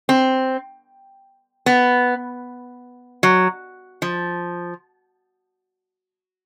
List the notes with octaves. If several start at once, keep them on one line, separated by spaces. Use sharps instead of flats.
C4
B3
F#3
F3